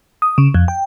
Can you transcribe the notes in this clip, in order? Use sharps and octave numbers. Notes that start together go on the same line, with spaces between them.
D#6
C#3
F2
G5